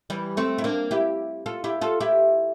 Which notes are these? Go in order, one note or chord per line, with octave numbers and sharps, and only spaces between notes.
E3 G3
A3 C4
E4
A#3 D4
E4 G4
F4 A4
E4 G4
F4 A4
E4 G4